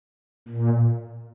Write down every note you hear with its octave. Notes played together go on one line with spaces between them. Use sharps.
A#2